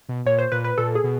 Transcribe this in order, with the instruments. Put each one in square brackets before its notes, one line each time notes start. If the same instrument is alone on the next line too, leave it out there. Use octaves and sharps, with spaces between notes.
[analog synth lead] B2
[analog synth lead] A#2 [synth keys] C#5
[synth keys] C5
[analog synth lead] A#2 [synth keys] B4
[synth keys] B4
[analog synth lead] A#2 [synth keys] A4
[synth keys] G#4
[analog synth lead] B2